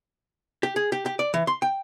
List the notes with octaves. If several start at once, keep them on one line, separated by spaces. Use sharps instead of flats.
G4
G#4
G4
G4
D5
E3
C6
G5